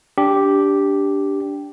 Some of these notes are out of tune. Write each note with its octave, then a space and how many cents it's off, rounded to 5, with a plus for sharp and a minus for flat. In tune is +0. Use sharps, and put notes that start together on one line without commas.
D4 -15 G4 +0